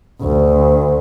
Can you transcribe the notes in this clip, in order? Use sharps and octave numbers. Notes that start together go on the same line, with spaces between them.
D2